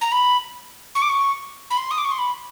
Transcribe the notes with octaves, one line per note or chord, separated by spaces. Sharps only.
A#5
B5
C#6
D6
C#6
B5
C6
D#6
D6
C#6
C6
B5